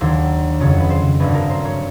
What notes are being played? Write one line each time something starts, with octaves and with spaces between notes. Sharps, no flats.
D#2 D3 F#3 C5
F2 C#3 F#3 C#5
B4
C5
G1 F#2 D3 B4
A#4
C5
C#5